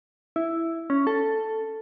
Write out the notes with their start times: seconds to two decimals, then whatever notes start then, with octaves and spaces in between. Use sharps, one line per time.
0.36 E4
0.90 C#4
1.07 A4